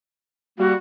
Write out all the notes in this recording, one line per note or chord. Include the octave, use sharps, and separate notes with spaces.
G3 A#3 F#4